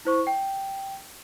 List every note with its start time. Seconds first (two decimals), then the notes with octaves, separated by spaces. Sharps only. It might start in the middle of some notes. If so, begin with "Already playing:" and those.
0.05 E4 C5 C#6
0.27 G5